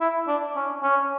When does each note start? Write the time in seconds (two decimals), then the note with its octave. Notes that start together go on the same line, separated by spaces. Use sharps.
0.01 E4
0.28 D4
0.56 C#4
0.83 C#4